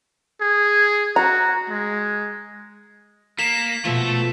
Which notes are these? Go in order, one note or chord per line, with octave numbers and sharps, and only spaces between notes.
G#4
F#4 A#5
G#3
A#3 A#4 B6 E7
B2 F3 A3 E5